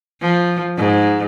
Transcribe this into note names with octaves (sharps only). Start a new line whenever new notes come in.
F3
G#2